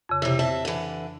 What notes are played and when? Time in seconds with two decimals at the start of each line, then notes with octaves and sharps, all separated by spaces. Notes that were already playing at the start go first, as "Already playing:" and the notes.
0.09 F2 C#3
0.22 C3 E3 E4
0.39 C4 E5 A5
0.65 D3 E3